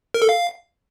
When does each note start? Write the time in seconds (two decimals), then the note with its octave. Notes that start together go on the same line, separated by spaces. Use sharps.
0.14 A#4
0.22 A4
0.29 F5